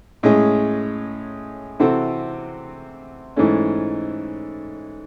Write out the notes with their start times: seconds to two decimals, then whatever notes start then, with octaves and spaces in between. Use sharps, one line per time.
0.23 A2 G#3 C#4 G#4
1.80 C3 E3 C4 F#4 A4
3.37 G#2 E3 A3 C#4